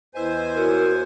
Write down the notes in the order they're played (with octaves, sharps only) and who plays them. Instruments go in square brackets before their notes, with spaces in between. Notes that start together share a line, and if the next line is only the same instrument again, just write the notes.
[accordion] E2 C5 G#5 [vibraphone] E4 B4 D#5
[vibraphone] E4 F#4 C#5 [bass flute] A#4